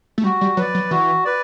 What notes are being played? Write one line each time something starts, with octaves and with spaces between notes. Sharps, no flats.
A3
G3 F#4
G3
F#3 B4 D5
F#3
E3 F#4
B4 D5